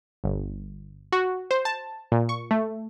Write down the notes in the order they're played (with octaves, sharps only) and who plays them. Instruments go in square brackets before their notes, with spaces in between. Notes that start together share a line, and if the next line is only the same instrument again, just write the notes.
[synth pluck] G1
F#4
C5
A5
A#2
C#6
A3